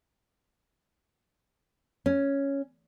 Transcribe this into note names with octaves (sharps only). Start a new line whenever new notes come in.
C#4